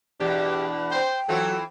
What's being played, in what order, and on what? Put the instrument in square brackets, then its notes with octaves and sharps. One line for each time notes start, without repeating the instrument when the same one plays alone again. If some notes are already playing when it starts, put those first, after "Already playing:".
[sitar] E2 B2 [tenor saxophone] D4 [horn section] G4
[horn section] C5 [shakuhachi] G5
[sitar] E3 C4 F4 [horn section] F#3 [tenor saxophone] A4